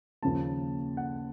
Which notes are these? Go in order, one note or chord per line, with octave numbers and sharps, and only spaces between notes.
D#2 C#3 F3 A#3 A5
F#5